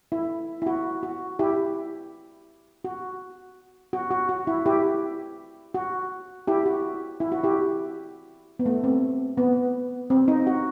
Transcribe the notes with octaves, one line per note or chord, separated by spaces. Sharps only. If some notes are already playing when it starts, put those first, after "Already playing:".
E4
E4
F#4
F#4
E4 G4
F#4
F#4
F#4
F#4
E4
E4 G4
F#4
E4 G4
F#4
E4
F#4
E4 G4
B3
A3
C4
B3
C4
D#4
F#4